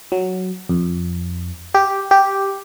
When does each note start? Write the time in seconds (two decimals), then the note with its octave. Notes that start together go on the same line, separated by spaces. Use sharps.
0.12 F#3
0.69 F2
1.75 G4
2.11 G4